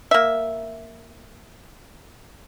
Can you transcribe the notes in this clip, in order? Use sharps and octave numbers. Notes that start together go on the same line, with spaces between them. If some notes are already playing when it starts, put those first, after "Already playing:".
A#3 E5